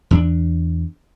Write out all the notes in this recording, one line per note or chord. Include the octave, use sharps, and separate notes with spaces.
E2 C#4 D4